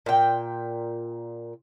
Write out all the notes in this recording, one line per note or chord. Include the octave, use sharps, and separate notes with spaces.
A#2 G5